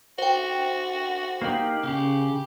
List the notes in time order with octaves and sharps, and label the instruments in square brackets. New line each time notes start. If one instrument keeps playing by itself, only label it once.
[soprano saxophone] F#4 [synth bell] C5 G5
[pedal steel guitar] A#3 D#4 G4 [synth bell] C7 F#7
[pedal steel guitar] C#3 [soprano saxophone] G4